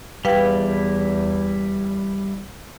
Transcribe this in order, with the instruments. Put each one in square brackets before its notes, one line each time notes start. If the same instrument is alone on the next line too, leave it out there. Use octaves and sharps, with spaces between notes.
[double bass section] E2 [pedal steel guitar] G3 E4 [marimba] B4 F5 G5